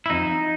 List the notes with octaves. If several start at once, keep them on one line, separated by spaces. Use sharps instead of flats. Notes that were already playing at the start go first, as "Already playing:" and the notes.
E4
F2 D#4